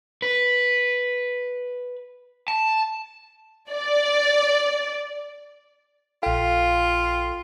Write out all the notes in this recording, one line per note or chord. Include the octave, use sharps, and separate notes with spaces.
B4
A5
D5
A#1 F4 A4 F5 G5